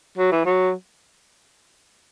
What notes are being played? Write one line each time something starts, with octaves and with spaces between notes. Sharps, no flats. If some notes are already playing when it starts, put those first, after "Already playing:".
F#3
E3
F#3